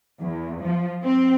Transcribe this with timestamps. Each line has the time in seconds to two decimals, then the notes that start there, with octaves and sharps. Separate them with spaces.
0.20 E2
0.61 F3
1.04 C4